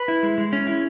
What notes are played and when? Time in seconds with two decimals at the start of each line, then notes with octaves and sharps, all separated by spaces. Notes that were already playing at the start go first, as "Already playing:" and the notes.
Already playing: B4
0.08 E4
0.23 G#3
0.38 G#3
0.53 C#4
0.67 E4